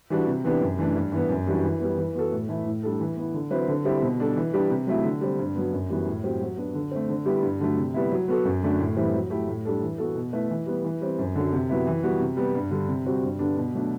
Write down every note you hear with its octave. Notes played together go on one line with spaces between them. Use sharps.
E3 G3 D4 F#4
C3
E3 B3 D4 G4
F#2
E3 A3 D4
G2
E3 B3
F#2
E3 G3 D4 F#4
E3
G3 B3
E3
B3 F#4 A4
A2
E3 A3 E4
A2
G3 D4 A4
E3
B3 E4
D3
F#3 C4 E4 B4
D3
G3 C4 E4 G4
B2
G3 D4 A4
E3
G3 D4 G4 B4
C3
F#3 A3 E4
D3
G3 C4
G2
F#3 B3
F#2
E3 G3 B3 F#4
A2
F#3 C4 G4
F#3
B3 D4 F#4
D3
A3 C4
D3
G3 B3 E4 G4
G2
D3 F#3 A3
C3
G3 B3 E4
F#3
B3 F#4 A4
F#2
D3 A3 D4 F#4
A2
E3 G3 C4 E4
F#3
A3 E4 G4
A2
G3 D4 A4
E3
B3 F#4 A4
B2
A3 E4 B4
E3
G3 B3
E3
G3 C4
F#2
D3 F#3
C3
F#3 B3 E4
E3
G3 B3 F#4
C3
G3 B3
G2
D3 G3
C3
G3 C4 F#4
G2
D3 G3 B3 D4
B2
F#3 A3 D4